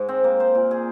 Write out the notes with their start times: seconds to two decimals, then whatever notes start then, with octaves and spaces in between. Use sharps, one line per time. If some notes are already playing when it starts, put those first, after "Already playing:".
Already playing: G#2 G#3
0.08 C4
0.24 A#3
0.40 C5
0.55 A#2
0.71 G#4